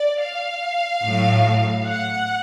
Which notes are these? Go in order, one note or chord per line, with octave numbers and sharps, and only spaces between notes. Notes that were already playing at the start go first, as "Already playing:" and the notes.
Already playing: D5
F5
A2 F#3
F#5